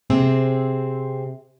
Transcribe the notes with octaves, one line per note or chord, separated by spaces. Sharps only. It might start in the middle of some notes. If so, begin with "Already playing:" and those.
C3 C4 G#4